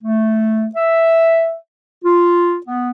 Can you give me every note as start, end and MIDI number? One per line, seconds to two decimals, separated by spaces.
0.03 0.67 57
0.76 1.56 76
2.05 2.58 65
2.67 2.91 59